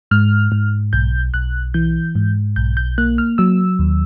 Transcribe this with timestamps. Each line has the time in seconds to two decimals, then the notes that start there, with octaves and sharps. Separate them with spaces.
0.11 G#2 F6
0.52 G#2
0.93 B1 G6
1.34 B1 F#6
1.74 E3 G6
2.15 G#2
2.56 B1 G6
2.77 G6
2.98 A#3 F#6
3.18 F6
3.38 F#3 E6
3.79 D#2